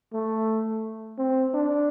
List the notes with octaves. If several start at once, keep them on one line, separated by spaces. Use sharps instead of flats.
A3
C4
D4